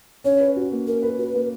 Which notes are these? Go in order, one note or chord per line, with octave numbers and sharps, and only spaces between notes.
C#4 C#5
B4
F#4
A#3
C#4 A#4
B4
F#4 B4
A#3